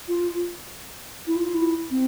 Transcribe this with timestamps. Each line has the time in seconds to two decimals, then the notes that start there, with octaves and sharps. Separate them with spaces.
0.08 F4
1.27 E4
1.36 F4
1.54 E4
1.91 C4